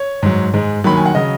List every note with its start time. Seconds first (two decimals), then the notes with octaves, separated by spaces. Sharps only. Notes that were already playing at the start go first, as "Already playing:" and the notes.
Already playing: C#5
0.23 G#2 F#3
0.54 G#2 G#3
0.84 D#2 D#3 F#3 B5
0.96 G#5
1.06 F#5
1.15 C#3 F#3 D#5